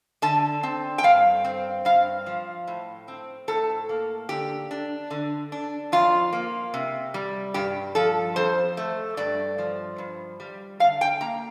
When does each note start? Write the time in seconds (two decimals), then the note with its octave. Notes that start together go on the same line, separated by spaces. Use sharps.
0.22 D3 A5
0.63 C4
0.98 G5
1.03 G2 F5
1.44 C4
1.85 G2 F5
2.26 F3
2.67 A2
3.08 C4
3.48 A2 A4
3.89 A#3
4.29 D3 G4
4.71 D4
5.11 D3
5.52 D4
5.92 F2 F4
6.33 A#3
6.74 C3
7.14 G3
7.54 G2 G4
7.95 F3 A4
8.36 F2 C5
8.77 A3
9.17 G2 D5
9.58 F3
9.98 G2
10.40 G3
10.80 D3 F5
11.01 G5
11.21 A#3 A#5